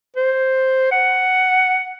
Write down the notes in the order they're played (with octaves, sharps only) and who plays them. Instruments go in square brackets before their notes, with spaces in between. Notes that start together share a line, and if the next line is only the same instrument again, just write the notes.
[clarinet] C5
F#5